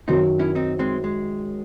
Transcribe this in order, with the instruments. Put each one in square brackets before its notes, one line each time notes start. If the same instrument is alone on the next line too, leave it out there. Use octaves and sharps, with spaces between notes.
[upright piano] F#2 D#3 F#3 [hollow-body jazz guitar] C4 D#4
[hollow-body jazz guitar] C#4 E4
C4 D#4
G#3 C4
G#3